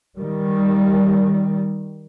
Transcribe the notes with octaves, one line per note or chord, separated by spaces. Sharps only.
D#3 G3